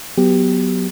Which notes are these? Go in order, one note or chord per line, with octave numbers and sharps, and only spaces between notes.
F#3 B3 G4